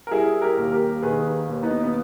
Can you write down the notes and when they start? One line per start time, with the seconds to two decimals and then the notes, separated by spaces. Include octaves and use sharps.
0.07 A#4
0.11 G3 E4 G#4
0.42 G4 A#4
0.57 D#2
0.72 G4 A#4
1.02 D#3 G#4 B4
1.48 D#2
1.63 B3 D#4
1.83 B3